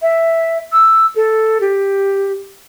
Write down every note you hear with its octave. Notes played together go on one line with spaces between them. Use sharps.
E5
E6
A4
G4